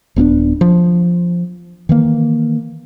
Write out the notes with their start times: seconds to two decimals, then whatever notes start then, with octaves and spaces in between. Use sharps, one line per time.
0.16 D#1 B3 C#4 D4
0.61 F3
1.89 D#3 E3 A#3